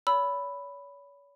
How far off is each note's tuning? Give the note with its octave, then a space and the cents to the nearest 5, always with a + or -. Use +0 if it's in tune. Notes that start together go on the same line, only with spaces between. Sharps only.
C#5 +40 B5 +0 E6 +0